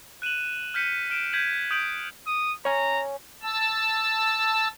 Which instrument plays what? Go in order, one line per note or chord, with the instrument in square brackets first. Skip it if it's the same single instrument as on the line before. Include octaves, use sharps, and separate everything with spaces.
[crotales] F#6 D#7 E7 F#7
F6 G6 B6 C#7 D#7
F6 D7 E7
G6 G#6 B6 D#7 F#7
D#6 G6 D7 F#7
[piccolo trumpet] D#6
[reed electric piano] C#5 G#5 [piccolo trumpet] A#5
[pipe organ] A5 E6